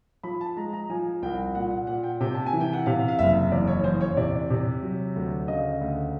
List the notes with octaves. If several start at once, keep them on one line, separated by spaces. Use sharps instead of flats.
F3 B5
A5
G#3 A#5
A#5
F3 G#5
C2 G5
A#2 F#5
F#5
A#2 F#5
G5
C3 G5
A5
G#5
E3
G5
F#5
C3 F5
F5
F#1 E5
E2 D5
C#5
E2 C5
C#5
C3 D5
C3
F#3
D2
C#3 D#5
D2